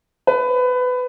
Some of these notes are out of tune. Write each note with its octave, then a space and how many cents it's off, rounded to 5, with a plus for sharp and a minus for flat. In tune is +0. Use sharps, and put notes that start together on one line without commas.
B4 +20